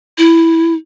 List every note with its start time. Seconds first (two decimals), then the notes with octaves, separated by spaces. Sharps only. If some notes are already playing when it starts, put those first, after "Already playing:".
0.18 E4